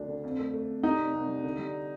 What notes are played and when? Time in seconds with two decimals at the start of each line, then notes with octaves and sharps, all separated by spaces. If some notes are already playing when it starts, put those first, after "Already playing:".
Already playing: D2 D4
0.08 D3
0.23 F2
0.39 A3
0.54 A3
0.69 F2
0.83 G3 D#4
0.98 C2
1.14 C2
1.28 G3
1.44 D3
1.59 G3